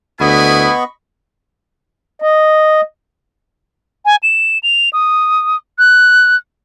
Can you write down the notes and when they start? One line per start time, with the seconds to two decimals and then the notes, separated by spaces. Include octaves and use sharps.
0.20 D2 B3 E4 B4 D#5 G#5 B5 C#6
2.22 D#5
4.05 G#5
4.23 E7
4.63 F7
4.93 D#6
5.79 F#6